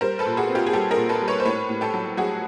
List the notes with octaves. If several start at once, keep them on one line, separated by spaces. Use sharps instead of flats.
G3 A#4 C5
A4 B4
A#2
F#4 G#4
C4
F4 G4
G#4
G3 G4 A4
G#4 A#4
A#2
A4 B4
G3
B4 C#5
C5
A2 B4 C#5
A2
G4 A4
F#3
F#3 F#4 G#4